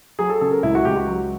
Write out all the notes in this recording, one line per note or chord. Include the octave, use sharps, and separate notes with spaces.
F#3 G#4
A4
C#3 A4
A#4
C#2 E4
F#4
C#2 G4
F#4
F#3